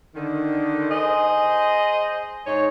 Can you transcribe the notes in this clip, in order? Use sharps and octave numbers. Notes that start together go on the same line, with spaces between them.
D3 D#3
G#4 C5 D#5
G#2 D#4 C#5